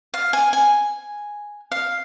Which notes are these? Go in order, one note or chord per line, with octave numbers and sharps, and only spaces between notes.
F5
G#5
G#5
F5